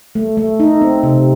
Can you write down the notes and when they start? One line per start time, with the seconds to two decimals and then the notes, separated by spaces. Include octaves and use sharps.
0.15 A3
0.37 A3
0.60 D#4
0.81 C4
1.03 C3